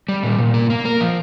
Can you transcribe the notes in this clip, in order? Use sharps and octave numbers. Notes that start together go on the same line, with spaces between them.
G3
A#2
A#2
A#3
A#3
A#4
F3